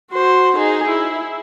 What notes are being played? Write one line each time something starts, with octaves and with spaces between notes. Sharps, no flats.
F#4 C5
D#4 G#4
E4